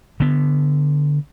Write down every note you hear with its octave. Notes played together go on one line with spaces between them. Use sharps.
D3 B3